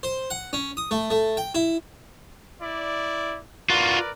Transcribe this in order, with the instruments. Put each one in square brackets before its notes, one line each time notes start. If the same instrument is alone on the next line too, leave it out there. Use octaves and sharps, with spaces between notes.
[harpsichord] C5
F#5
C#4
D#6
A3
A3
G5
E4
[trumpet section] E4 D5
[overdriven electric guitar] F4 F#4 [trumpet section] A#4 B4 D5